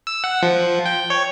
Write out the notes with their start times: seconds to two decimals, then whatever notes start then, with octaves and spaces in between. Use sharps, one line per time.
0.07 E6
0.24 F#5
0.43 F3
0.86 G5
1.10 C#5